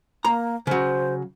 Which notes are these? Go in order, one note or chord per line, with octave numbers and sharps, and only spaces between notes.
A#3 A#5
C#3 F#3 C5